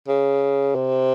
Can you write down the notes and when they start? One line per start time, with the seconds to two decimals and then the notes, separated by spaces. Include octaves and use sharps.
0.08 C#3
0.75 C3